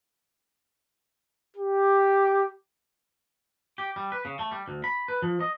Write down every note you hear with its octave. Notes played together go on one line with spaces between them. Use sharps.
G4
G4
G3
B4
C#3
A3
G3
D2
B5
B4
F3
D#5